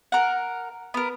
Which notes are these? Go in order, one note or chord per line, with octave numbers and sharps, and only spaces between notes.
A#4 F#5
B3 A#4